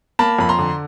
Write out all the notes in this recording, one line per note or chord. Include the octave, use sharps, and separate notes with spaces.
A#3 A5 B5
F2 B5
A#5 C6
D3